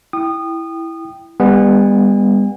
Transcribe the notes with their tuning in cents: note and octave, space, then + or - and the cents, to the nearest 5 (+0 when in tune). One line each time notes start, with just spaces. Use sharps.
E4 +0 G5 +0 D#6 -25
G3 +40 B3 +0 G#5 -35